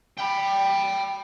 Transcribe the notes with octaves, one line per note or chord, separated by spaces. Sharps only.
G5 B5